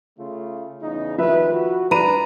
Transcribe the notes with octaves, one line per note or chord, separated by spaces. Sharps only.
C#3 A3 F4
E2 C#3 D#4
C2 D#3 F3 B4 E5
F#4
G3 D4 B4 A#5 B5 D#7